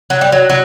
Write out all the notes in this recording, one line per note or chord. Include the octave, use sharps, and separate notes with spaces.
F#3
G3
F#3
F#3